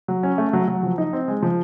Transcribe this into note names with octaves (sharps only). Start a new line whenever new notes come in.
F#3
C#4
A3
F#3
F#3
F3
D#4
C4
G#3
F3